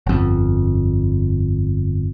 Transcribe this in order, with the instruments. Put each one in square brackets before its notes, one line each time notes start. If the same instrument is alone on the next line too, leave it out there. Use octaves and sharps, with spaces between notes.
[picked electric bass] G1 F2